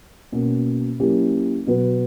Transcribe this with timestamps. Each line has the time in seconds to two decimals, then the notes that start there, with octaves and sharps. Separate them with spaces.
0.32 B2 A#3 C#4
1.00 F#3 A#3 C#4 E4 G4
1.67 B2 F#3 B3 F#4 B4